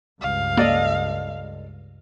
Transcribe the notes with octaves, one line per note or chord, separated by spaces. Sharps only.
C#2 G2 F5
A#3 A4 D5 D#5